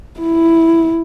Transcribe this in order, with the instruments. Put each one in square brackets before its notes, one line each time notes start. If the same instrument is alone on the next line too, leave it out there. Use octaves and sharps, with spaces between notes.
[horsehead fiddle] E4